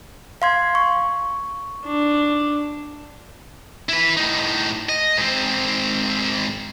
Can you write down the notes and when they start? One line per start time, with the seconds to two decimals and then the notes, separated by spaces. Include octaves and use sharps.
0.42 F5 C6 G#6
0.75 C#6
1.85 D4
3.89 E4 B4
4.17 A2 D#4
4.89 D#5
5.17 G#2 C4